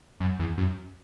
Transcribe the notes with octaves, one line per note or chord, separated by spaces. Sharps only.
F#2
E2
F#2